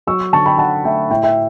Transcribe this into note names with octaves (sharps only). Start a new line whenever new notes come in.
F#3 C#6 E6
D3 A5 C#6
G5 B5
D3 F#5 A5
A3 E5 G5
A2 E5 G5
E5 G5